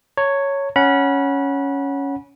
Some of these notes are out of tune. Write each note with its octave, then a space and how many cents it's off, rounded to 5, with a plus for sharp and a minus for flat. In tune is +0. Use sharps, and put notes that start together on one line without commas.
C#5 +0 A#5 -45
C#4 +5 F#5 +0 B5 -30